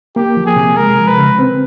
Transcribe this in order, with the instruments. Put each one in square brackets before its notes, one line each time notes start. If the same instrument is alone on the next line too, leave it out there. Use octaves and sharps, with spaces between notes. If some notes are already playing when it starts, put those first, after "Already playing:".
[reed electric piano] A#3 [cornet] G4
[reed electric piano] F3
[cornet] G#4
[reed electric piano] C3
[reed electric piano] G#3 [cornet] A#4
[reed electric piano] F3
[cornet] B4
[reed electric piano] C#3
C4